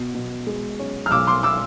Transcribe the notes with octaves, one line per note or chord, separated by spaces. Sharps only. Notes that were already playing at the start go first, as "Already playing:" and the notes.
Already playing: B2
B2
G#3
C#4
F6
B1 D6 E6
C6 D6
D6 E6